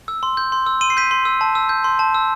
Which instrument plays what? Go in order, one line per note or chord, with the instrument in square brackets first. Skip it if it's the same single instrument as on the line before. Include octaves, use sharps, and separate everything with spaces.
[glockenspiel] E6
C6
G6
C6
E6
C6 D#7
C7
G6 B6 D#7
C6
E6
A5
E6
G6
C6
A5
E6